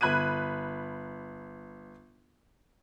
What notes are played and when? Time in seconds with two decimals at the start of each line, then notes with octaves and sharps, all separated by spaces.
0.01 G1 B5 F#6 G#6 D#7